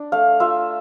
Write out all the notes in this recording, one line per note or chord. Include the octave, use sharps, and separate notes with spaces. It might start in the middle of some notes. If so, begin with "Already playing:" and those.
Already playing: D4
A3 F5
F4 E5